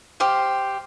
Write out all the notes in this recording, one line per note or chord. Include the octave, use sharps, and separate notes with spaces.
G4 C5 F5